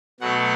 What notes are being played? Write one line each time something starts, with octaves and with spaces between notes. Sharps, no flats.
B2 F#3 A3 F#5